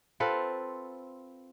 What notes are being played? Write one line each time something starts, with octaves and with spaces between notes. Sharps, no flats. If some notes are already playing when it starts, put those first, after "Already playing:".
C4 F4 A4 B4